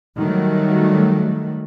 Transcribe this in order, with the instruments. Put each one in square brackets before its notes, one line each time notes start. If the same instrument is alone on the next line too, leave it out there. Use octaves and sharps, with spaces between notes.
[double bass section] D#3 F#3 G3 A3